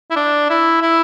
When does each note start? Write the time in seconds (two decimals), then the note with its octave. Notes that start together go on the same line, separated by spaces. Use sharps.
0.11 E4
0.16 D4
0.50 E4
0.82 E4